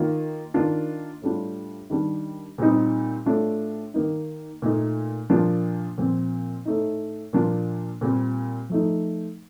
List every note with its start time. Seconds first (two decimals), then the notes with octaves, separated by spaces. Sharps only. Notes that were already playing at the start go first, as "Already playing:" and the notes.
Already playing: D#3 A#3 F4
0.54 D#3 A#3 D4 F4
1.22 A2 G3 D4 F4
1.90 D#3 G3 D4
2.58 A#2 G3 C4 D#4
3.26 A2 A3 D4 F4
3.94 D#3 A#3 D#4
4.62 A#2 A3 D#4
5.30 A#2 F3 A#3 D4 F4
5.98 A#2 F3 C4
6.65 A2 A3 D#4
7.33 A#2 F3 A#3 D4 F4
8.01 A#2 G3 C4
8.69 F3 A3 D#4